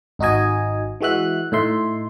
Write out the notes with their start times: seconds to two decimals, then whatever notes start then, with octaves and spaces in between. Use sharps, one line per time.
0.19 G#1 D#4 F#4 D#5 G#5
1.01 E3 G#3 F#4 E5 F#6
1.52 A2 D#4 E5 C6